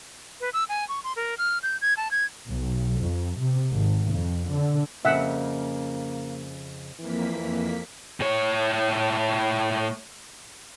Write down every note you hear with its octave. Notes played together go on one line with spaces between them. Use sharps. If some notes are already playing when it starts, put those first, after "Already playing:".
B4
E6
G#5
C#6
C6
A#4
F6
G6
G#6
A5
G#6
B1
F2
C3
G#1
F2
D3
F2 C#3 A#3 E5 F#5
F2 E3 A#3 B6
A2 C#5